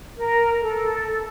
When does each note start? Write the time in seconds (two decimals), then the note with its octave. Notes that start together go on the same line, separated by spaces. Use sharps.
0.16 A#4
0.62 A4